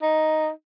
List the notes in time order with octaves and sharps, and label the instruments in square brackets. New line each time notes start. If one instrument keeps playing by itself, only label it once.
[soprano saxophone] D#4